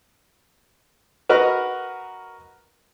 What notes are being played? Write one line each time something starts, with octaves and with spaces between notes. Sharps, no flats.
F#4 A#4 B4 D#5 C#6 F6